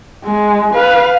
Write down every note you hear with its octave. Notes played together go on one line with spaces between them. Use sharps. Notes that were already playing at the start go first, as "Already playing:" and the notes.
G#3
B4 F5